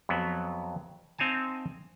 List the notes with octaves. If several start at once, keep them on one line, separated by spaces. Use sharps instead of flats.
F2 F#3 B3
C4 D#4 F5 G#5 A5